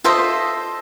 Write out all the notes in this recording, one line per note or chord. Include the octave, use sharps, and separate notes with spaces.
F4 A4 C5 D#5 E5